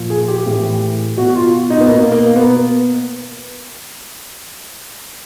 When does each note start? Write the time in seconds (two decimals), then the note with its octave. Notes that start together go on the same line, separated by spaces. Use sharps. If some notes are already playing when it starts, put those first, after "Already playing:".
Already playing: A#2 F3
0.10 G#4
0.28 G4
0.46 A2 E3
1.17 B2 F#4
1.35 F4
1.70 D#4
1.80 B3
1.87 B2 A#3
2.12 A#3
2.36 B3